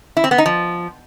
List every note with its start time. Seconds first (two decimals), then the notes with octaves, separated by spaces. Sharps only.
0.17 E4
0.24 C4
0.31 B3
0.38 D#4
0.46 F3